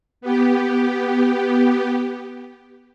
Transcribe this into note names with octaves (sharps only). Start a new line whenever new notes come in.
B3 G4